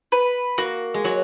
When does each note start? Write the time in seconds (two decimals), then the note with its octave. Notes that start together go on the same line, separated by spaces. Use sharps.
0.12 B4
0.58 A#3 F#4
0.94 G#3
1.04 F#3 F#4